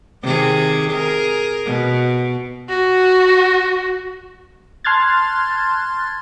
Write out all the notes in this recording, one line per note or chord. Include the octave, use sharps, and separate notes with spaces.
C3 D#3 G#4
G#4 A#4
B2
F#4
A5 C6 F6 F#6 G#6 A6